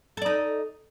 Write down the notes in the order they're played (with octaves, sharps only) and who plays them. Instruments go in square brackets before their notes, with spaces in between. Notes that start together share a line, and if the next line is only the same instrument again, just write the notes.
[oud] A4
D5
D#4